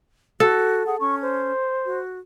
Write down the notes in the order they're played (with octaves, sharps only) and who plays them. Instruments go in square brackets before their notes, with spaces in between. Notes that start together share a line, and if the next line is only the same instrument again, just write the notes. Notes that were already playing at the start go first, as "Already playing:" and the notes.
[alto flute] F#4 [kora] A4
[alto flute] G#4 [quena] F#5
[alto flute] C#4 [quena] C#6
[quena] C5
[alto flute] F#4